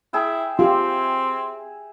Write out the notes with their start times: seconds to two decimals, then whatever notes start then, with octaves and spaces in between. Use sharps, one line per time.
0.13 E4 G#4 E5 G5
0.59 C4 F4 G4 C6